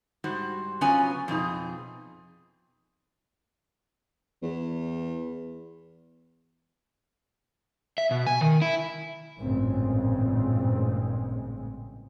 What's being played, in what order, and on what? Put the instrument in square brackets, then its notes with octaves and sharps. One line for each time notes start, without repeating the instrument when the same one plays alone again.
[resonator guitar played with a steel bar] G#2 G3 F#4 C5
C#3 F#3 B3 C#4 F4 G#5
F2 B2 D#4 G#4
[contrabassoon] E2
[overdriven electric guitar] E5
B2
G#5
D#3
E4
[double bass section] A1 G2 A#2 C#3 G#3 C4